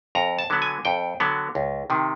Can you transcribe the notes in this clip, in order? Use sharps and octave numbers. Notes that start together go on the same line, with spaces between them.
F2 A#5
A5
D3 F#3 B3
G#5
F2 G5
D3 F#3 B3
C#2
C3 D#3